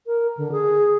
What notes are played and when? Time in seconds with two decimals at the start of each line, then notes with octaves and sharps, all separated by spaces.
0.07 A#4
0.37 D3
0.52 G#4